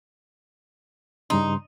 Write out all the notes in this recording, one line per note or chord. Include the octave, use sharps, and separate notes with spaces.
G2 C#3 D#4 C6